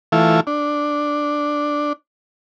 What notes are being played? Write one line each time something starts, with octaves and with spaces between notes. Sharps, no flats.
E3 A3 E4 F4
D4